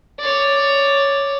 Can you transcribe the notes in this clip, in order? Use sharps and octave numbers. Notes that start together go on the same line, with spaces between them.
C#5 D5